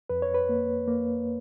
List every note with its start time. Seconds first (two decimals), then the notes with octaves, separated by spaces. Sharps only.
0.09 F2 B4
0.22 C#5
0.34 B4
0.49 A#3
0.88 A#3